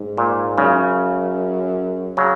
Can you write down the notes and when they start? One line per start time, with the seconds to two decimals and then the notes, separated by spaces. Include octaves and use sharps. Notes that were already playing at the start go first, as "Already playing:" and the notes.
Already playing: G#2
0.17 A#2
0.58 F#2 C#3
2.17 C#3 F#3